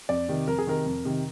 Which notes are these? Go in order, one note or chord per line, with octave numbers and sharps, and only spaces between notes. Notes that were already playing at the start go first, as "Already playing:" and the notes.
F2 D5
C3 D#3
F2 A#4
G#4
C3 D#3 A#4
F2
C3 D#3